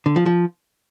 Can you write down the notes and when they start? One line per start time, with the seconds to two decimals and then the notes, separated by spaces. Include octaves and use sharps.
0.06 D3
0.16 F3
0.26 F3